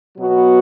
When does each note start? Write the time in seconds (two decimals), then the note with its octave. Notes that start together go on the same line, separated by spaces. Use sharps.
0.17 B2 F#3 B3 F#4